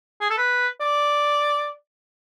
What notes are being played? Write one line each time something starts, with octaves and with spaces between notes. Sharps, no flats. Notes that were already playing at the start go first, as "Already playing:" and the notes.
G#4
A4
B4
D5